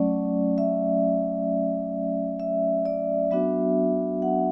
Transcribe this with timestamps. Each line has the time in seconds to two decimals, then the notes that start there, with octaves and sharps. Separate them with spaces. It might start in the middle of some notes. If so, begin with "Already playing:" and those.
Already playing: F#3 A3 C#4 D5
0.58 E5
2.40 E5
2.86 D5
3.31 F#3 B3 D4 F#4 E5
4.22 F#5